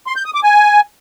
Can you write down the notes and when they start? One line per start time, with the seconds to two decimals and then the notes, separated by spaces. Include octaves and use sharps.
0.07 C6
0.16 G6
0.25 D#6
0.34 D6
0.43 G#5